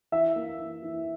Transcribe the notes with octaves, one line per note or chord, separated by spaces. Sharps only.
E3 E5
A#3
E3
E3